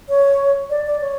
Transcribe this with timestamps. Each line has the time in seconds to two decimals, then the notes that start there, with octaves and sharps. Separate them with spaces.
0.09 C#5
0.70 D5
0.86 D5
1.01 C#5